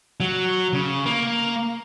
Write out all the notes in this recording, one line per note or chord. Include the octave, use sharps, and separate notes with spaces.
F#3
C#3
A#3